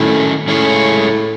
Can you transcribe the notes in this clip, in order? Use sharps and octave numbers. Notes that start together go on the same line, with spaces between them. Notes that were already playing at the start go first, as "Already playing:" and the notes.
Already playing: A2 D#3 F#3 A3 C#4 E4
A2 G#3 C#4 E4 G#4 C#5